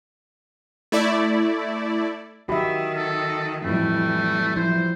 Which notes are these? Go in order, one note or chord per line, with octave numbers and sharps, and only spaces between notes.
A3 E4 D5
D#3 F#4 G4 E5 B5
A4
F2 A2 E3 G3 A3
F3 E4 C5